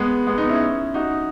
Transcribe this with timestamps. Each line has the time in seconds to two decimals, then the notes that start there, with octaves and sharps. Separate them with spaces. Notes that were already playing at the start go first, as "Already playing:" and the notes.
Already playing: G#3 B3
0.27 G#3 B3
0.38 B3 D#4
0.49 C#4 E4
0.94 D#4 F#4